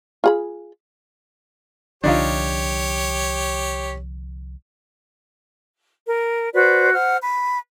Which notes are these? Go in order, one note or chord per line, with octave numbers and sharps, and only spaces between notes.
F4 G#4 B5
C2 D3 F3 D4 D#4 F4 G4 C#5
A#4
F#4 B4 C5 D5
C5 F#5 F6
B5